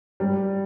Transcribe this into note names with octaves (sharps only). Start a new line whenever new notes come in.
G3